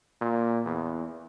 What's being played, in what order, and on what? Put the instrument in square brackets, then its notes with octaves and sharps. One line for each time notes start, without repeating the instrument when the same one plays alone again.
[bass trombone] A#2
E2